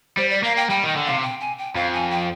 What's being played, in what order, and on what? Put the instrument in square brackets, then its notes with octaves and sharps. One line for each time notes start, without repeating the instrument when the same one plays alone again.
[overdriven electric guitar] G3 [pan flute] C5
[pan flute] D5
[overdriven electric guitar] A#3 [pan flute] F5
[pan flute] G5
[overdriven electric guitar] G3 [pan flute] G5
[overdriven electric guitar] D#3 [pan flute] G5
[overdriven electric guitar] D3
[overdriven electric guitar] C3 [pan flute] F5
[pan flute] G5
G#5
G5
[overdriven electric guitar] F2 [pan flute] F5
[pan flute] G#5
G5